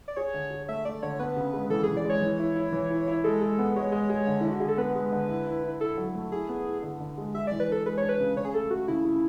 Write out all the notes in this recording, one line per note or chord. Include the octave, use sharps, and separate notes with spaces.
D5
G#4 C#5
D3
G#4
A3 E5
A3 D5
D3 C#5
B3 B4
C#3
G#3
E3 A4
G#4
E3
D5
G#3 C#5
E3
E4
E4
E3
E4
E4
G#3 A4
G#3
B3
G#3 C#5
G#3
G#3
D3
D3 E4
F#4
D3 G#4
A4
B3 B4
G#3
D3
E4
E4
E4
E4 A4
F#3
A3
E4 G#4
B3
E4
D3
D3
G#3
G#3 E5
E3 D5
B4
D4 A4
G#3 B4
D4 C#5
B4
C#3
C#3 C#5
G#4
A3 A4
A3 F#4
C#3 E4
C#3